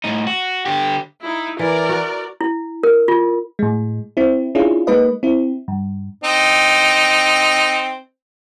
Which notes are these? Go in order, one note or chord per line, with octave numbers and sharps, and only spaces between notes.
A2 D#4
F#4
D3 G4
D#4 E4
E3 A#4 D5
F#4
E4
A#4
F4
A2 G#3
C4 E4
C#4 D4 E4 F4 G#4
G#3 A#3 D#4 B4 D#5
C4 E4
G2
C4 D#4